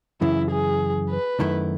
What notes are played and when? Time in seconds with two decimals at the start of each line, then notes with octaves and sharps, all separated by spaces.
0.21 F#2 C#3 E3 E4
0.51 G#4
1.10 B4
1.40 F#2 D#3 A3 E4